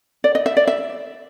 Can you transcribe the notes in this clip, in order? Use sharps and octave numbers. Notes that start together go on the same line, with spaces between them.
D5
D#5
E5
D5
E5